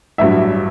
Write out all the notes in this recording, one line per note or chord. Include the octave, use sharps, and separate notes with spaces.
A1 G2 F#3 E5